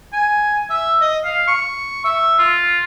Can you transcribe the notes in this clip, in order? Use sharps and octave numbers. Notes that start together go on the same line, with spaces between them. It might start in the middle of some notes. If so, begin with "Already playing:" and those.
G#5
E5
D#5
F5
C#6
E5
F4